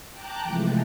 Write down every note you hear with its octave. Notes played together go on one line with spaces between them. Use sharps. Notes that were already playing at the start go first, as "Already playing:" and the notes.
G5 A5 A#5 D6 F#6 G6
C3 E3 F3 G#3 A3